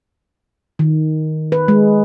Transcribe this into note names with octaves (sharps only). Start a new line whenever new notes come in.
D#3
B4
G#3